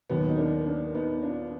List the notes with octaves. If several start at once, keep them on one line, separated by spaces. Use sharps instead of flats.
D#2 D#3 F#3 B3
D#4
A#3 D4
A#3 D4
B3 D#4
D4 F4